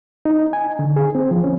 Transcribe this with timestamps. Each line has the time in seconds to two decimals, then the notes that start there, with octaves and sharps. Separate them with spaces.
0.25 D#4
0.53 G#5
0.79 D3
0.96 G#4
1.15 C4
1.31 F3
1.44 C#4